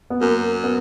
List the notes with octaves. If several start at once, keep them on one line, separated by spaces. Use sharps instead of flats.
B3
F#2 A#3
B3